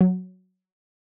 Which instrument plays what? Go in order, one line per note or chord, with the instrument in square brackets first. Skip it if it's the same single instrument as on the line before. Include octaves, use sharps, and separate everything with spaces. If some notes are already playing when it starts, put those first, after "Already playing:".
[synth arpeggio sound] F#3